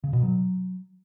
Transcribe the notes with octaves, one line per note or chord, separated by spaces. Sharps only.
C#3
B2
F#3